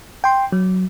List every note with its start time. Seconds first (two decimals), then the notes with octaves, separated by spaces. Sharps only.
0.24 G5 C6
0.52 F#3